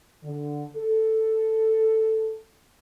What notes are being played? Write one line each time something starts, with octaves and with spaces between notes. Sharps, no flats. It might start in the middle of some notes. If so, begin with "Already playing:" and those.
D3
A4